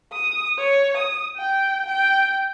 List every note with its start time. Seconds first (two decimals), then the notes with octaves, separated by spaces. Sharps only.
0.12 D#6
0.58 C#5
0.97 D#6
1.36 G5
1.86 G5